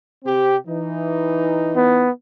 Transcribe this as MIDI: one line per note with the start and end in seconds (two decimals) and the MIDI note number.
0.24 0.55 48
0.24 0.55 60
0.24 0.55 67
0.66 2.06 52
0.66 2.06 63
1.77 2.11 59